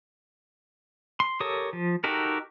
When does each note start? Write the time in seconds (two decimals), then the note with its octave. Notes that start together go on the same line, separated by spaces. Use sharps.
1.20 C6
1.40 G4 A4 A#4 C#5 D#6
1.73 F3
2.04 D#4 F#4 G4 A4 A#4